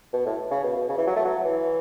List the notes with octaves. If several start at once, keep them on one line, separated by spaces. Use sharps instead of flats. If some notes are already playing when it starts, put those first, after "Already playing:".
B2
A2
C#3
B2
B2
C#3
E3
F#3
A3
F#3
E3